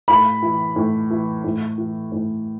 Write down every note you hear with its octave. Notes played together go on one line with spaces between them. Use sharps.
A2 B5
E3
A2
E3
A2
E3
A2